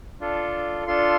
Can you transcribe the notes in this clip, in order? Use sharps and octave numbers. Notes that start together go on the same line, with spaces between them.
D4 F4 A4
D4 F4 A4 C6